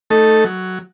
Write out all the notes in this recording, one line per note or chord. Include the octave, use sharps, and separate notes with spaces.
A3 D#4 A4
F#3